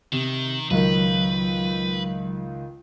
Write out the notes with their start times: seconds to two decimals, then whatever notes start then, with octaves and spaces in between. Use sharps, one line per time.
0.12 C3 D#3
0.71 C#2 D#3 F#3 B4